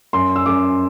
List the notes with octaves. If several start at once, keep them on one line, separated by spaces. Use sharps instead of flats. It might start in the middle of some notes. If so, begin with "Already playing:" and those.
F#2 C6
E6
F#2 D6